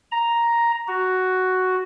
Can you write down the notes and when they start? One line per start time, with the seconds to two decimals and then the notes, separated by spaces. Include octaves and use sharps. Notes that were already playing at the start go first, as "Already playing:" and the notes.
0.12 A#5
0.88 F#4